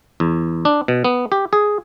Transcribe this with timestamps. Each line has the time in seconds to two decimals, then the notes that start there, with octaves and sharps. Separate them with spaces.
0.20 E2
0.65 D4
0.88 B2
1.05 B3
1.32 G4
1.53 G#4